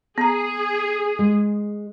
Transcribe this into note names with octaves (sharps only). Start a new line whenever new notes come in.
B3 G#4 A#5
G#3